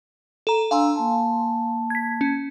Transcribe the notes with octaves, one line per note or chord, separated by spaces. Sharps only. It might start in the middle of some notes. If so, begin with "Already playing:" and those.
A4 A#5
D4 F5 G#5 A#5 C6 E6
A#3 A5
G#6 B6
C#4